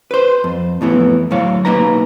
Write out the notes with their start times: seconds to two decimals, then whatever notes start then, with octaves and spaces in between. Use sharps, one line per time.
0.11 B4 C5
0.44 F2
0.81 F2 A2 E3 B3
1.31 D2 A2 F#3 C5 C#5 F5
1.65 B1 A#2 A#3 D#4 B4 A#5